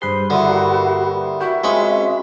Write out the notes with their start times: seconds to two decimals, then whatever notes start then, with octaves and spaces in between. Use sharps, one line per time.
0.02 G2 G#4 B4 C5 C6
0.30 D3 E4 F#4 D#5 G#5
0.47 G3 A#3
1.41 F#4 E5 G5
1.64 G#3 C4 C#4 F4 B5 C#6